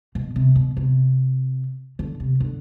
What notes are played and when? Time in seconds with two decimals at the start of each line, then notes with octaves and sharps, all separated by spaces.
0.15 B2
0.36 C3
0.56 B2
0.77 C3
1.99 D3
2.20 C3
2.40 D3